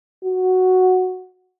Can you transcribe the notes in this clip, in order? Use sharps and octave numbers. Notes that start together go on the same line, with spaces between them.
F#4